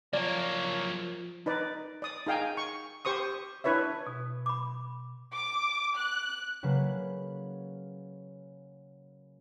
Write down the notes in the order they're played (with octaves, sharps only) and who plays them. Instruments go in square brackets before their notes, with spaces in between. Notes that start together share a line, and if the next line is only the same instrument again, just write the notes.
[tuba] F3 [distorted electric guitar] F#3 A#3 [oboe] C#5 [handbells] D5
[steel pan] D#4 B4 D5
D5 D#6
D#4 G#4 F5 G5 G#5
C#6
G4 C5 C#6 D#6
D4 E4 B4 C#5 E5
[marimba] B2
[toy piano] B5 D6
[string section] D6
F#6
[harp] C#3 F#3 A#3 B4